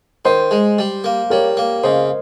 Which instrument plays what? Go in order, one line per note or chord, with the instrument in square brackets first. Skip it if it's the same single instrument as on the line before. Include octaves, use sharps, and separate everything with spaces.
[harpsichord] D#3 [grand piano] C5
[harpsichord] G#3
G3
A#3
[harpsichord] G3 [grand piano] A#4 C#5
[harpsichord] A#3
[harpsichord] C#3 [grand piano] C5 D#5